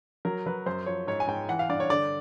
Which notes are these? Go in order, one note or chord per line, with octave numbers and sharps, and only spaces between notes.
F#3 A#4
F#3 B4
F#2 C5
F3 C#5
G#2 C#5
G#5
G#2 G5
E3 F#5
F5
G2 D5
C#5
D3 D5